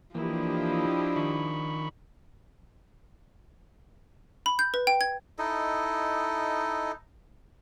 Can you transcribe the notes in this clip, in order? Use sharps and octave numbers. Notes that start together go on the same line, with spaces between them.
E3 F3 A#3 D4 E4 G4 D#5
D#3 B5 C#6
B5
G6
B4
G5
G#6
D#4 E4 A4 D#5